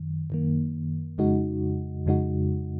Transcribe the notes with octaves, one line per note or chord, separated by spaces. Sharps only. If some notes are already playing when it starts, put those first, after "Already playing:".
Already playing: F#2 D#3
F#2 D#3 A#3
F2 C#3 G#3 D#4 F#4
F2 C#3 G#3 D#4 F#4